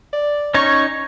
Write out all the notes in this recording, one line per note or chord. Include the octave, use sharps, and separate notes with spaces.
D5
C#4 D#4 C#5 C#6